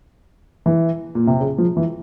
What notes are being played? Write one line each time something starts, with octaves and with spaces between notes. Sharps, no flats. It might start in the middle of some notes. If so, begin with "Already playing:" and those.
E3
A#2
C3
C#3
F3
E3